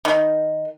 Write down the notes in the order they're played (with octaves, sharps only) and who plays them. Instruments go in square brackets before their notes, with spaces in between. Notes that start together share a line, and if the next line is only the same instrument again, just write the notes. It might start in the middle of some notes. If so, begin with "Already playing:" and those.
[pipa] D#3